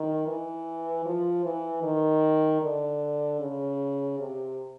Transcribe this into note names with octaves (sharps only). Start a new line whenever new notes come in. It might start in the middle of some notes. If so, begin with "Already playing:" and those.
Already playing: D#3
E3
F3
E3
D#3
D3
C#3
C3